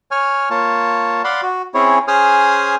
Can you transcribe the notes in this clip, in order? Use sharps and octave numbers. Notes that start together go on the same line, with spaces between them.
C#5 G#5 F6
A#3 F4 C#5 A5
D5 F5 F#5 B5 C6
F#4
C4 C#4 E4 G#4 C#5
C#4 G#4 C5 G#5 D#6 F6